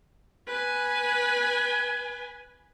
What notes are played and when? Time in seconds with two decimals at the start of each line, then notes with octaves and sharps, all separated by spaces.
0.47 B4 G#5